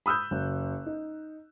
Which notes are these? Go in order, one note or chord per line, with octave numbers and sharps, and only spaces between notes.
B5 D#6 E6 F#6 G6
F#1
D#4